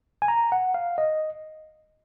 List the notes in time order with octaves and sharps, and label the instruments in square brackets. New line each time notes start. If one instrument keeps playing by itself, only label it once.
[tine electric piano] G#5
A#5
F#5
F5
D#5